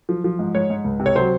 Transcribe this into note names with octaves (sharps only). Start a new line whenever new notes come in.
F3
F3
G#2
G#2 C#5
G#2
C#2
C3
C#5
F#3 C5